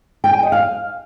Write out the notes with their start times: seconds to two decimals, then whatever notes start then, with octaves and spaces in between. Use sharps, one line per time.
0.24 G5
0.33 G#5
0.43 D#5
0.52 F5